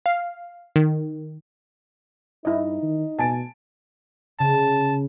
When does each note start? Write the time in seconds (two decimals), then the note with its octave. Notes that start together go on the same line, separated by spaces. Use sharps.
0.06 F5
0.76 D#3
2.45 G2 D#4 E4 D#5
2.82 D#3
3.19 B2 G#5 A5 D7
4.39 C#3 A5